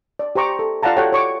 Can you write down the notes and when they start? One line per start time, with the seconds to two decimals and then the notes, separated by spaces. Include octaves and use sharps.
0.19 D5
0.35 G4 C5 A#5 C#6 D6
0.59 A4
0.83 F4 D5 F5 F#5 A5 A#5
0.96 F#4 G4 A4 C#5 F#5 G5
1.12 C#5 C#6 D6